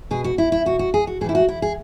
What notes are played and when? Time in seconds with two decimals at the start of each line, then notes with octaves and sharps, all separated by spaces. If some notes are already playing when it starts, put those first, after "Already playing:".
0.11 B2 G#4
0.24 F#4
0.38 E4
0.52 E4
0.66 B2 F#4
0.79 F#4
0.94 G#4
1.07 F#4
1.21 A2 G#4
1.24 E3 E4
1.35 F#4
1.49 E4
1.62 G#4